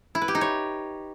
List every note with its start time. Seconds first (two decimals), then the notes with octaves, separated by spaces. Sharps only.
0.15 E4
0.22 B4
0.28 G4
0.35 D#4
0.41 C#5